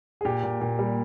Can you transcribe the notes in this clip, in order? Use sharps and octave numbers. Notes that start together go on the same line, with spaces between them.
G#4
A#2 G4
A#2
A#2
G3